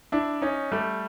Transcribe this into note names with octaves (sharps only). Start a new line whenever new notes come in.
D4 E4
C#4 D#4
G3 A3